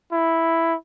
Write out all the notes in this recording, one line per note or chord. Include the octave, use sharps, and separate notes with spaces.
E4